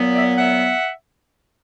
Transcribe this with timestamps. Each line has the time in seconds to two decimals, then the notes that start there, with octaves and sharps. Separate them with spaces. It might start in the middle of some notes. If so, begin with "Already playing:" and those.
Already playing: A#2 F#3 B3
0.14 D5 E5
0.36 E5 F#5